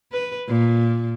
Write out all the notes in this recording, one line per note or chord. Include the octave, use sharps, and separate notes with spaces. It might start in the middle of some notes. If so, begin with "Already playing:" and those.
B4
A#2